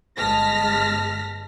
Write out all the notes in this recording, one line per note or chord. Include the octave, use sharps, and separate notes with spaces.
G1 G#3 A5 F6 A#6 B6